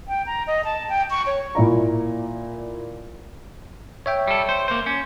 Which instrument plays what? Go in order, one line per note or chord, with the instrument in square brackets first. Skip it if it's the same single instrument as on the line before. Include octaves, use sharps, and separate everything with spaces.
[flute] G5
A#5
D#5
A5
G5
C#6
C#5
[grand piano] A#2 E4 D5 A#5
[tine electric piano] C#5 E5 G5
[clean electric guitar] G3 A4
C5
A#3 C5
C#4